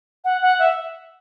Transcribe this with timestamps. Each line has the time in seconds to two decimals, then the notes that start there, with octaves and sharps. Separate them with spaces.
0.24 F#5
0.42 F#5
0.59 E5